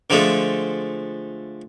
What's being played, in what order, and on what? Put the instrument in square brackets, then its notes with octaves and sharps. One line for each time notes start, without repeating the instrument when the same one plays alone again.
[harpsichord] D3 F3 G#3 A3